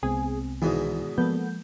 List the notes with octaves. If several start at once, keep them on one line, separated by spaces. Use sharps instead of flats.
C2 G#3 B3 C4 G#4
E2 G#2 B2 D#3 E3
F3 G#3 A#3 B3 A4 G6